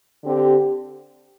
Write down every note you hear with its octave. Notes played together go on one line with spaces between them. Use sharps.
D3 C4 G4